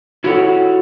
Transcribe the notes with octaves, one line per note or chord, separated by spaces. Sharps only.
E4 F#4 G4 A4 C#5 F#5